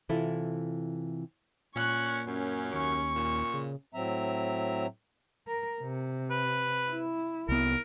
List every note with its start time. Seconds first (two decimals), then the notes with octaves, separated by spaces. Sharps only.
0.09 C3 E3 E4 F4 A4
1.76 A#2 C#4 C#6 F#6
2.27 F#2 C#4
2.73 D#2 C#6
3.16 A#2
3.54 C#3
3.94 A2 F#3 C4 E5 A#5
5.48 A#4
5.81 C3
6.30 B4
6.89 E4
7.49 C2 B3 A#4